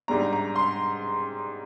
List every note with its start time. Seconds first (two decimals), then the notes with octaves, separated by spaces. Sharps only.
0.08 G#2 G3 D4 A#5
0.33 A#5
0.56 C6